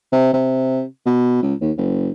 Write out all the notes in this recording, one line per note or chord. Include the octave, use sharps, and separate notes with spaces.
C3
C3
B2
C#2
D#2
F#1